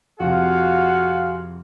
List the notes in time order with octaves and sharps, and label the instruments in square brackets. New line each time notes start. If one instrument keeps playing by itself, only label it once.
[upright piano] F2 C3 [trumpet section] F4 G#4 F5 [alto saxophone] F#4 [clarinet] F#5